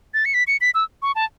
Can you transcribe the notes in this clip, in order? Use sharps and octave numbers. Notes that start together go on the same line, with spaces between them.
A6
C#7
B6
C#7
B6
E6
C#6
A5